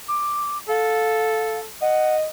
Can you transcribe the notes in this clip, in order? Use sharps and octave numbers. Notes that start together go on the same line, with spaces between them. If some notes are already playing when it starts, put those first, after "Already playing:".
D6
A4 F5
D#5 F#5